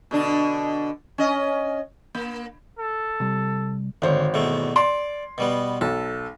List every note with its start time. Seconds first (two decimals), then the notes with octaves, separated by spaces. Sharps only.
0.11 B2 D3 D4
1.18 C#4 D#5
2.15 A#3
2.79 A4
3.20 C3 G3
4.02 G#1 D2 C5 C#5
4.34 E2 B2 A3
4.76 D5 C6
5.38 B2 G3 B3
5.81 B1 A4